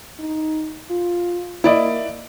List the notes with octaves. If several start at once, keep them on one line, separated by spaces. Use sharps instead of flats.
D#4
F4
A#3 E4 D5 D#5